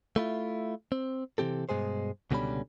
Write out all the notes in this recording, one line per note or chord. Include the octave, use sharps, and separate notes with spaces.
A3 E4 F4
C4
C3 E3 C4 G4 A4
G2 B2 G#3 G#4 C5
C#2 B2 D3 G3 C#4 B5